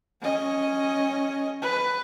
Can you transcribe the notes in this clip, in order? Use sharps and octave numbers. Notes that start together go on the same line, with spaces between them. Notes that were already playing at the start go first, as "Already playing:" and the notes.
C#4 D#5
B4